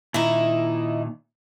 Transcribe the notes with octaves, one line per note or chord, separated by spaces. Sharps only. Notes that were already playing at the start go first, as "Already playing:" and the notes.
A#2 D#3 D#4 E4